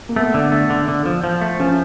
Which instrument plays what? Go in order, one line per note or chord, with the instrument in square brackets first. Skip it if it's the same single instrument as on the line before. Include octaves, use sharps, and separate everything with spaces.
[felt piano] A#3
[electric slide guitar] A3 [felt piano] B3
[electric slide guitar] D3
A3
D3
D3
F3
F3
A3
[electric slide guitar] F3 [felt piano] C#4